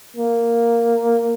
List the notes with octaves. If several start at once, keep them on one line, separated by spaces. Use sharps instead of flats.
A#3